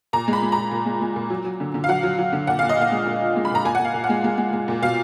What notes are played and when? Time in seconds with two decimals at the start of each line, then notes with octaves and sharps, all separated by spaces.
0.13 A#2 A#5
0.28 G#3
0.33 B5
0.43 G#3
0.52 A#2 A#5
0.71 A#2
0.86 G#3
1.01 G#3
1.16 A#2
1.30 F#3
1.45 F#3
1.60 D3
1.74 D3
1.84 F5
1.88 F#3 F#5
2.03 F#3
2.18 F#3
2.33 D3
2.47 A#2 F#5
2.59 A#2 F5
2.69 D#5
2.77 A#2 F5
2.92 G#3
3.06 A#2
3.21 F3
3.36 G#3
3.45 B5
3.51 A#2 A#5
3.65 A#2 G#5
3.75 F#5
3.80 A#2
3.85 F5
3.94 A#2
4.04 F#5
4.09 G#3
4.24 G#3
4.38 G#3
4.53 G#3
4.68 A#2
4.82 B2 F5